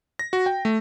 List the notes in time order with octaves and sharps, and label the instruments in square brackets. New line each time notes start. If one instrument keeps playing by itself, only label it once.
[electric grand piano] A#6
F#4
G5
A3